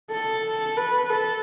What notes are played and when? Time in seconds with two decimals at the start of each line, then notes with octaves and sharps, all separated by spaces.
0.11 A4
0.77 B4
1.11 A4